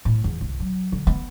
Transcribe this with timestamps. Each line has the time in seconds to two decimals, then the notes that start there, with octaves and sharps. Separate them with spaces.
0.05 A2
0.24 E2
0.41 C2
0.60 F#3
0.92 D3
1.07 B3